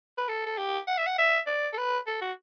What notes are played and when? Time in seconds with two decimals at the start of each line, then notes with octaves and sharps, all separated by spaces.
0.18 B4
0.28 A4
0.46 A4
0.58 G4
0.87 F#5
0.98 E5
1.06 F#5
1.18 E5
1.47 D5
1.73 A4
1.77 B4
2.07 A4
2.21 F#4